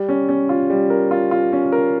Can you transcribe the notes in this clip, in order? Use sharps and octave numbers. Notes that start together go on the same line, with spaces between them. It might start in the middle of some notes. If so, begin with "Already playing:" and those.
Already playing: G3
C#4
C#4
F4
G3
A#4
F4
F4
C#4
A#4